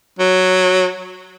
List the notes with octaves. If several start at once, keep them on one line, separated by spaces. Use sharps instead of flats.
F#3